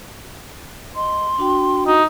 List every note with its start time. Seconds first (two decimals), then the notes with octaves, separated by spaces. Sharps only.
0.96 D#5 C6
1.38 D4 F#4 G5
1.87 D#4 F#4